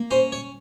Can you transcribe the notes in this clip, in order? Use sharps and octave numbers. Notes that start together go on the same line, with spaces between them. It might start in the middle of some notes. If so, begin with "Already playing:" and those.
Already playing: A#3
C#4 C5
C#5